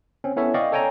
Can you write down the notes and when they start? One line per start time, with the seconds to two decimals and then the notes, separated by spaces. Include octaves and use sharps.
0.24 C4 C#4
0.36 B3 C#4 E4 A4 C#5 E5
0.54 D5 D#5 F5 G5 C#6
0.72 A4 C#5 G5 G#5 A#5